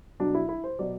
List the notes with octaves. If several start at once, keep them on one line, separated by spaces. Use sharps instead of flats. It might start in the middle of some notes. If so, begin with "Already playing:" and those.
B2 F#3 D4
E4
E4
C5
B2 F#3 D5